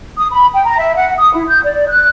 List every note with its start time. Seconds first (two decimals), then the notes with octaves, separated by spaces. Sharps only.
0.17 D#6
0.31 B5
0.54 G5
0.65 A#5
0.79 E5
0.95 F#5
1.18 D#6
1.33 E4
1.48 G6
1.64 D5
1.88 F#6